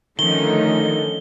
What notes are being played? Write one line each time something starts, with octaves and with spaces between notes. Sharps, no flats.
D3 D#3 F3 A3 C#4 D#4 G7